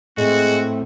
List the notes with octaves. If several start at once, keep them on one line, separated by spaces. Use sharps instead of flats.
A2 G#3 C4 F#4